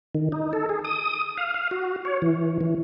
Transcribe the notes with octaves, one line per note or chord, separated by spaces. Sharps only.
D#3
D#4
A4
G#4
D#6
F5
F5
F#4
C#5
E3
E3